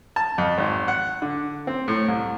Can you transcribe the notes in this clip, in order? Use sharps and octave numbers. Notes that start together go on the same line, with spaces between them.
A5
F2
G#1
F#5
D3
C4
A2
C2